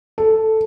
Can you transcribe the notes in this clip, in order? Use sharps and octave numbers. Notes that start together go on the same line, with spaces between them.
A4